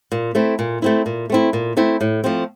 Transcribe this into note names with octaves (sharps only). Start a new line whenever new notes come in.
A#2
A3 C4 E4
A#2
A3 C4 E4
A#2
A3 C4 E4
A#2
A3 C4 E4
A2
F3 A3 C4